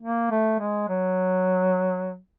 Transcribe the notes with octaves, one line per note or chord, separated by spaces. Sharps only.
A#3
A3
G#3
F#3